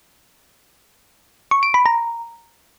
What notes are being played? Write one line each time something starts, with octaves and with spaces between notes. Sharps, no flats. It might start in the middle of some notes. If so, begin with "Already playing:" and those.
C#6
D7
B5
A#5